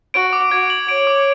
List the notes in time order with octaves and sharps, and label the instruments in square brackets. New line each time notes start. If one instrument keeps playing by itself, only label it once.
[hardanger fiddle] F#4 [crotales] D7
[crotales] D6
[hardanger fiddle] F#4 [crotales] G#6
[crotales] F#7
[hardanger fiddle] C#5 [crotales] D7
[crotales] D6